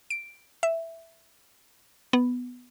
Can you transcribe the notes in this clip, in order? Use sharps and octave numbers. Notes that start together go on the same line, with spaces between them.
D7
E5
B3